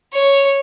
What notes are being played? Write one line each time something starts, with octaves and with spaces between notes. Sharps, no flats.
C#5